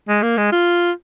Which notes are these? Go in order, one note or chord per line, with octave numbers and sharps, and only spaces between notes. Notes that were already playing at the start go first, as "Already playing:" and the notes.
G#3
A#3
G#3
F4